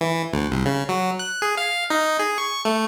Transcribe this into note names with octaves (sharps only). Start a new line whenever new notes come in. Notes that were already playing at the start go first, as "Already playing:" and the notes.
E3
D2
C2
C#3
F#3
F#6
G#4
F5
D#4
G#4
C#6
A3